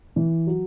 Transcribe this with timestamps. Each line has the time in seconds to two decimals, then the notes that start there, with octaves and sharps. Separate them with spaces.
0.16 E3
0.47 F#3